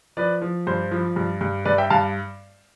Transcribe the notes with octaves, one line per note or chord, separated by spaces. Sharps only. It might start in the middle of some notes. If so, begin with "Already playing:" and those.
F3 B4 D5
F3
G2 C5
F3
G2
G2
G2 B4 D5
E5 G5
G2 F5 A5